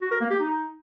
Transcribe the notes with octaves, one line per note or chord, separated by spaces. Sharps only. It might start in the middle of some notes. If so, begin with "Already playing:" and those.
F#4
A#4
A#3
G4
D#4